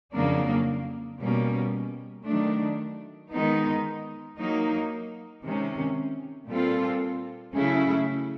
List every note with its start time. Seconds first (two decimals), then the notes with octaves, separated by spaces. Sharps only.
0.13 F2 C#3 F#3 A#3 D4
1.20 B2 G3 A#3 C#4
2.26 D#3 F#3 A3 D4
3.31 D#3 G#3 B3 D#4
4.38 F#3 A#3 D#4
5.44 C3 D#3 G#3 C#4
6.50 A#2 G3 C4 F4 A4
7.55 C#3 F#3 A3 C#4 E4